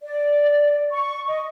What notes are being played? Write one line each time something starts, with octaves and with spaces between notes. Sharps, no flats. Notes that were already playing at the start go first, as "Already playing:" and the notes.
D5
C#6
D#5